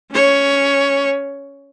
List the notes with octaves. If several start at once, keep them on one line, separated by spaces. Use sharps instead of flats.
C#4 C#5